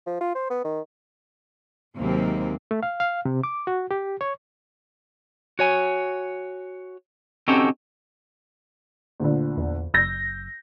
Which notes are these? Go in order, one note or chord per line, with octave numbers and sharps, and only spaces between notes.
F3
F4
C5
B3
D#3
D#2 C3 F#3 G#3 A#3 C4
A3
F5
F5
C3
D6
F#4
G4
C#5
F#4 C#5 G#5
C4 C#4 D#4 F#4 G4 A4
D2 A#2 D3
E2
F#1 E6 G6 A#6